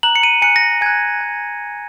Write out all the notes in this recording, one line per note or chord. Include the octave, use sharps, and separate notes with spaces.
A#5 F#6 F#7
C#7
D#7
G#5 F#6 C#7
A#6
G#5 F#6 G#6
G#5 F#6